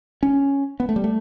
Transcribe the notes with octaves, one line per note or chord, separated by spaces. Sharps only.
C#4
B3
A3
G3
A3